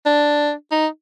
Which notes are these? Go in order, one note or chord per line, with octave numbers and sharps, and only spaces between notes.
D4
D#4